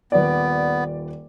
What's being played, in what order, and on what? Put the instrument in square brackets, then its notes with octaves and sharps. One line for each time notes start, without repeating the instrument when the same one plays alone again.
[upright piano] D#1 B4 D5 [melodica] B3